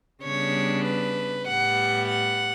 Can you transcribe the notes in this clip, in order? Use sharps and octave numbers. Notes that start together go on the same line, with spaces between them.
C#3 G3 B3 D4 C#5
B4
A2 G3 B3 F#5
F#5